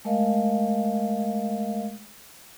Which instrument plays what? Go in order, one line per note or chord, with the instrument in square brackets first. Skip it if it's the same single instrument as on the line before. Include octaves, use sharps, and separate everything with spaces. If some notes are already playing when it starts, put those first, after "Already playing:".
[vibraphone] G#3 A3 A#4 D#5 F5